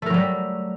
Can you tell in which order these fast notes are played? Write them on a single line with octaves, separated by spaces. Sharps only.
A3 A#4 F#3 G3